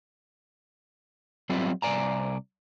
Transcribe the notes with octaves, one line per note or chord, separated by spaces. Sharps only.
F#3 G3 B3 C4 E4 F4
C2 F2 D5 G#5 A#5